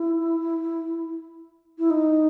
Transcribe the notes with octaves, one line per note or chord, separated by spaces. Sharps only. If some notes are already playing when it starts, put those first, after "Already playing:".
Already playing: E4
E4
D#4